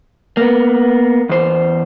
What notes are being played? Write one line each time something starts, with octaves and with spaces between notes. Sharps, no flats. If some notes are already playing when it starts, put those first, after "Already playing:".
A#3 B3
E2 C5